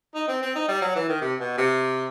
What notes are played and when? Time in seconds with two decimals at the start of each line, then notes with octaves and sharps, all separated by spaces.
0.15 D#4
0.28 C4
0.42 C4
0.55 D#4
0.68 G3
0.82 F#3
0.95 E3
1.08 D#3
1.21 C3
1.40 B2
1.58 C3